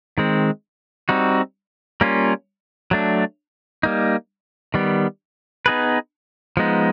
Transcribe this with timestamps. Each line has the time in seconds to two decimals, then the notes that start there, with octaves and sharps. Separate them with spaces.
0.18 D#3 G#3 C4
1.09 G3 C4 D#4 F#4
2.01 G3 A#3 C#4 F4
2.91 F#3 A3 D4
3.83 G3 A#3 D#4
4.74 D#3 G3 B3
5.66 B3 D#4 G#4 B4
6.57 F3 G#3 B3 D#4